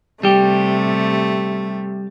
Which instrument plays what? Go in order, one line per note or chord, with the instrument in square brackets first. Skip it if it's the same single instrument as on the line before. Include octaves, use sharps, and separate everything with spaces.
[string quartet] C3 A3 [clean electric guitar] G3 G4